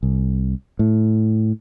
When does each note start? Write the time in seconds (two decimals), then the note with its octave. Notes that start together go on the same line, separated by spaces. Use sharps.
0.03 C2
0.79 A2